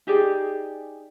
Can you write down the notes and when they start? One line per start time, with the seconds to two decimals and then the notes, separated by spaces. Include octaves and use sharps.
0.07 D#4 G4 G#4 D5